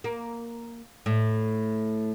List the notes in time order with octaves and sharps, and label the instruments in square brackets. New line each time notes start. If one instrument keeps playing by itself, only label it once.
[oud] A#3
A2